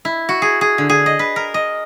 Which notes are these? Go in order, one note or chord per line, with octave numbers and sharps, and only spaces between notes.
E4
F#4
G#4
G#4
D3
G#4
D#5
B4
A#4
D#5